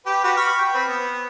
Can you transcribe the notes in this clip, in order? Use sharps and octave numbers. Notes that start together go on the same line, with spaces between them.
G4 B4
F#4 G4 B4
B5 C#6 F6
G5
C4 B4
B3